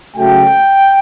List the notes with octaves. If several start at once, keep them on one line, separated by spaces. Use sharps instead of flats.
C#3 F#3 A3 G5